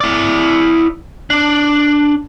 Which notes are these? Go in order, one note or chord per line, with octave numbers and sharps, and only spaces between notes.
E4 D5
D4